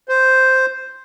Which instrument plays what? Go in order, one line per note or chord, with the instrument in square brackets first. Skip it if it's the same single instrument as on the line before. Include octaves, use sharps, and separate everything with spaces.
[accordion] C5